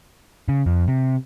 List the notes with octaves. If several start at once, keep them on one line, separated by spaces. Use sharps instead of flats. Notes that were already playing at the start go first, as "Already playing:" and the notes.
C#3
F2
C3